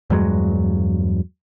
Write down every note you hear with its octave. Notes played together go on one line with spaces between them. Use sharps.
E2 G2 F#3 G#3